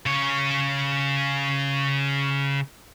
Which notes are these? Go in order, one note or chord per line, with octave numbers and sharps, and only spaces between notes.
C#3 C#5